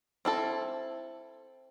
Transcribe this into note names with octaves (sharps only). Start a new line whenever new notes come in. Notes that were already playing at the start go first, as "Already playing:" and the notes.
C4 E4 A4